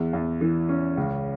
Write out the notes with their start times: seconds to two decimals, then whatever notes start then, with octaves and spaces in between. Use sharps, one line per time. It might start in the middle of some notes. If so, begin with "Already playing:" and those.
Already playing: E2
0.13 E2
0.41 E3
0.69 C#4
0.97 C#2